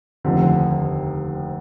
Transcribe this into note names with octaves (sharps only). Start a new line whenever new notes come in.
F1 D#2 D3 F3 C4